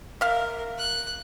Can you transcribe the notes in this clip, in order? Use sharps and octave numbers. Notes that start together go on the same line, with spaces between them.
A#4 E5 F5
F#6